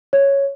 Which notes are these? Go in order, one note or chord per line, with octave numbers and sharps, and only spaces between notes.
C#5